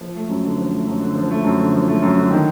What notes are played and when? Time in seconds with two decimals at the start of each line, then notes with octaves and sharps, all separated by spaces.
0.01 F3
0.15 A3
0.29 F#2
0.44 D3
0.58 F3
0.73 A3
0.87 F#2
1.02 D3
1.16 F3
1.31 A3
1.44 F#2
1.60 D3
1.73 F3
1.88 A3
2.02 F#2
2.17 D3
2.31 D#3